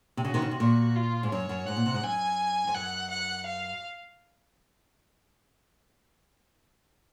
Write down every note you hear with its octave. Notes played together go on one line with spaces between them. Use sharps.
C3
C#3 F#4
C3 D#3
C#3
C3
A#2 F#4
F4
G#2
F#2 C#5
F#2
G#2 F#5
A#2
C3
G#2
F#2 G#5
F2
F#2 F#5
F#5
F5